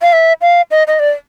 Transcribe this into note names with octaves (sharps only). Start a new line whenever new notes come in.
F5
E5
F5
D#5
D#5
D5